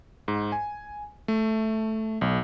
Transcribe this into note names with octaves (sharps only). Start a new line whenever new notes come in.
G#2
G#5
A3
B1